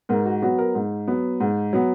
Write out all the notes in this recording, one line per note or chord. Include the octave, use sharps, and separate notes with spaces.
G#2 A#4
F#4
F#3 B3 F#4
A#4
G#2
F#3 B3
G#2
F#3 B3